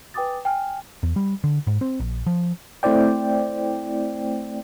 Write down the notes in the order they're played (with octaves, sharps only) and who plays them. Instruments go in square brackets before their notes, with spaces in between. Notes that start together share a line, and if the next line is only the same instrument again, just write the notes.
[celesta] B4 G5 G#5 D6 D#6 A6
G5 G#5 F6
[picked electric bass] E2
G3
D3
G#2
C4
A#1
F3
[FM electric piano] A3 C4 E4 C5 D5 G5